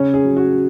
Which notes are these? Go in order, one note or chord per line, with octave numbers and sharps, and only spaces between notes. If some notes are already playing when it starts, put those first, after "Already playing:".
Already playing: C#3 C#4 C#5
G#4
F#3
F#4